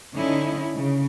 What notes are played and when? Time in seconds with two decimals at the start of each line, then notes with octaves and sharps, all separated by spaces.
0.15 D3 C#4 D#4 E4
0.74 C#3